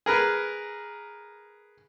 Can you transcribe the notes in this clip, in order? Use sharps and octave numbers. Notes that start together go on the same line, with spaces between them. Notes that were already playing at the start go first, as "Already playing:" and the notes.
G#4 A#4 B4